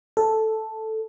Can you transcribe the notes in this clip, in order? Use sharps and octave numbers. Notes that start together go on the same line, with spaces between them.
A4